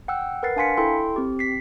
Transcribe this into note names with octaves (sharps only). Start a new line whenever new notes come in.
F#5 G5 E6 F#6
A#4 B4 F#5 A6 C7
D4 F5 G#5 C6 B6 C#7
E4 A4 G5 C6
C4 G4
B6 C7